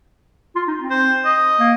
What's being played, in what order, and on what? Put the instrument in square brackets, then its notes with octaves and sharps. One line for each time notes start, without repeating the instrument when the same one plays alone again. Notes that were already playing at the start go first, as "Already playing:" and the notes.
[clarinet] F4
D#4
C4
[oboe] C5
D#5
[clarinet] A#3